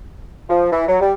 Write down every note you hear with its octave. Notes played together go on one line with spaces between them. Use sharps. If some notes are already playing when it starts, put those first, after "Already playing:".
F3
E3
F#3
G3